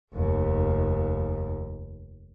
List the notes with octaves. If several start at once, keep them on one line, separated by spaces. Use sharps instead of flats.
F1 D#2